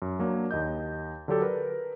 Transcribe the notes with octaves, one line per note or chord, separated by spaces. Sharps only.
F#2
F#3 A#3 D4
D#2 D#5 G6
D3 F#3 D4 G4 A4
A#4 B4